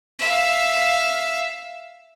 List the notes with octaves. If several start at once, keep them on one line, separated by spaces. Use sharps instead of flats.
E5 F5